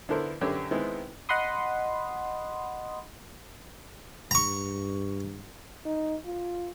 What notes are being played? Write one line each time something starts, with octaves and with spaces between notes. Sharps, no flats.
D3 B3 E4 A4 A#4 C5
F#2 D3 G4 B4 C#5
D#3 G#3 B3 C4 E4
D#5 F#5 B5 C6 D#6
G2 A#5 C#6
D#4
F4